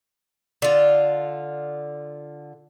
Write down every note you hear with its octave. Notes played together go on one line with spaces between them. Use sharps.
D3 F4